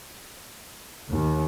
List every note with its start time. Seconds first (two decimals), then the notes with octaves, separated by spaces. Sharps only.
1.09 D#2